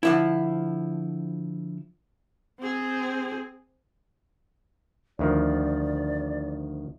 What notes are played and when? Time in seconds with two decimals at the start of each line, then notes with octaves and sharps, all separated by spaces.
0.03 D3 F3 E4
2.60 C4 G#4
5.19 D2 D#3 F3 D5